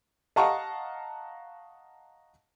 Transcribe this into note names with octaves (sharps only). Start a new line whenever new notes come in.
D#5 F5 F#5 A5 A#5 C#6